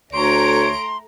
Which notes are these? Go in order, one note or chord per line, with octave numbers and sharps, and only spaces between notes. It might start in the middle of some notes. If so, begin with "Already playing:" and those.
D2 A3 C#5 A#5 C6 D7